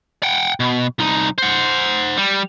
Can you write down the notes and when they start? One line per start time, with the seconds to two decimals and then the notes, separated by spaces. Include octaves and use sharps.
0.23 F#5 G5
0.60 B2
0.99 C2 D#4
1.38 C5 F#5
2.17 G3